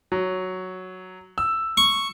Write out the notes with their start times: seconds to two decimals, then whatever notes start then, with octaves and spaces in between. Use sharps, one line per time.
0.12 F#3
1.38 E6
1.77 C#6